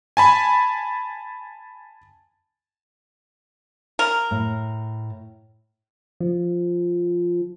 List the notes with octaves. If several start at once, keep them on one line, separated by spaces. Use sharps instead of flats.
G#5 A5 B5
A#4
A2
F3